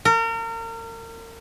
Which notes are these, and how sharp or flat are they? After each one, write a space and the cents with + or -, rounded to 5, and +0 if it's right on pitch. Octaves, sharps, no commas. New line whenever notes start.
A#4 -35